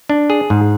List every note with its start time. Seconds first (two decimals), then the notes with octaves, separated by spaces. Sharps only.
0.10 D4
0.30 G#4
0.50 G#2